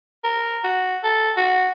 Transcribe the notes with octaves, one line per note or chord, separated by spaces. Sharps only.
A#4
F#4
A4
F#4